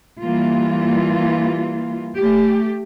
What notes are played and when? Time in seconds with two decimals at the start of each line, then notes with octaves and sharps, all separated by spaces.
0.21 E3 G3 A#3 F4
2.17 A3 G4